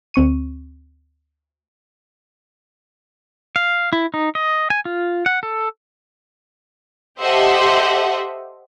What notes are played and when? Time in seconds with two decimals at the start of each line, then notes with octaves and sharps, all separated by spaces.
0.14 D2 C4 C#6 D#7
3.56 F5
3.93 E4
4.14 D#4
4.35 D#5
4.70 G#5
4.85 F4
5.26 F#5
5.43 A4
7.21 G4 A4 C5 D#5 E5 F#5